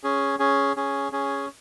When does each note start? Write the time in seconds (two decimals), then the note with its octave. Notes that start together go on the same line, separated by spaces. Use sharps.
0.04 C#4 G#4
0.39 C#4 G#4
0.76 C#4 G#4
1.12 C#4 G#4